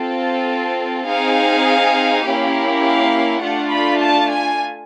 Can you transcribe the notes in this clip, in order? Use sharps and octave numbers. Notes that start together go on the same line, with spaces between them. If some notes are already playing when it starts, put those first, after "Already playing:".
Already playing: C4 F4 A4
C4 D#4 G#4 F5
A#3 C#4 E4 G4
F5
A3 D4 F4 F#5
B5
A5
G#5